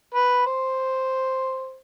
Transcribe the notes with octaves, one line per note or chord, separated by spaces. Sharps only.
B4
C5